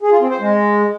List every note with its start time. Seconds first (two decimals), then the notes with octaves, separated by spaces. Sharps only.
0.02 G#4
0.11 F4
0.21 C4
0.30 C5
0.40 G#3